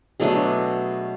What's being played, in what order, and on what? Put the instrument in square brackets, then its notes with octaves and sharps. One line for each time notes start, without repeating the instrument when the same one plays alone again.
[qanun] B2 F#3 A3 D4 G#4